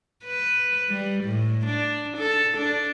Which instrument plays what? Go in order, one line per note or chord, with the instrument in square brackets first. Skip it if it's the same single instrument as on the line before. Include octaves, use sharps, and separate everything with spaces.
[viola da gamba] B4
G3
A2
D4
A4
D4